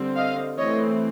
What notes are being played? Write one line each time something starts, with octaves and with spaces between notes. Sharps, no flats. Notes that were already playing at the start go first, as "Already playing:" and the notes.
Already playing: D3 G3 C4
D#5 F5
E3 A3 C4 C#5 D#5